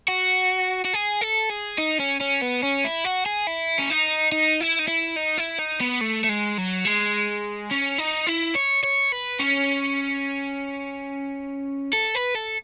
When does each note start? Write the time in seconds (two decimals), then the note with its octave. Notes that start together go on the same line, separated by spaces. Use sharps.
0.08 F#4
0.85 F#4
0.94 G#4
1.21 A4
1.50 G#4
1.78 D#4
1.99 C#4
2.20 C#4
2.41 B3
2.63 C#4
2.84 E4
3.04 F#4
3.26 G#4
3.47 E4
3.79 C#4
3.90 D#4
4.32 D#4
4.61 E4
4.79 D#4
4.88 E4
5.17 D#4
5.38 E4
5.59 D#4
5.80 B3
6.01 A3
6.24 A3
6.29 G#3
6.58 F#3
6.86 G#3
7.71 C#4
7.98 D#4
8.27 E4
8.55 C#5
8.83 C#5
9.12 B4
9.39 C#4
11.93 A4
12.15 B4
12.35 A4